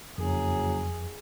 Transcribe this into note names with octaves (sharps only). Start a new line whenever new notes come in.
F#1 F2 F#3 G#4